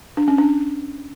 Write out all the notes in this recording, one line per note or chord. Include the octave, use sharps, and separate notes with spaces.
D4
C#4
D4